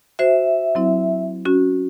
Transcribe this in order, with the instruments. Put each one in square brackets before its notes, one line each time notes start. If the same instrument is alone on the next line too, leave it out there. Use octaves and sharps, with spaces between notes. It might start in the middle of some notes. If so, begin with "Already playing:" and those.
[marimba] F#4 C5 [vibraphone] E5
[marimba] F#3 C4 E4
C#4 F#4